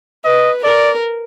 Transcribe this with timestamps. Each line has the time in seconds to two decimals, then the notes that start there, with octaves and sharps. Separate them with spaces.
0.24 B4 D#5
0.64 A#4 D5